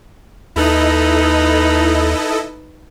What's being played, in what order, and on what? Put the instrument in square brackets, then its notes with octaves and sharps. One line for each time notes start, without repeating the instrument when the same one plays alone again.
[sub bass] D#2 [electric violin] D#4 B4 [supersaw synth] E4 A4 D#5